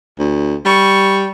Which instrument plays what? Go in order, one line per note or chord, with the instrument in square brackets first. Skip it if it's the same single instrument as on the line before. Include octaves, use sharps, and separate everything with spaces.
[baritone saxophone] D2
[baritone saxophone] G3 [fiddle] C#6